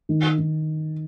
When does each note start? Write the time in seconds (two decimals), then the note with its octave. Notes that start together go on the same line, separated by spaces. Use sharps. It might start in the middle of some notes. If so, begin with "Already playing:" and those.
0.09 D#3
0.38 D#3